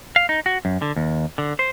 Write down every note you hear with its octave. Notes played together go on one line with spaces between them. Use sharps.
F5
D#4
F#4
F#2
D3
D#2
D3
C5